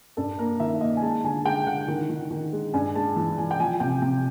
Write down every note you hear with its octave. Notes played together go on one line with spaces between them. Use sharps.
G2 A4
A#3 A#4
D#3 E5
A#3 D#5
G#5
G#3 A5
D3 G#5
G#3 G5
D3 F#5
D#3
D#3
D#3
G#3
G2 G#5
G#3 A5
E3 A5
E3 G#5
G5
F3 G#5
C3 G5
C3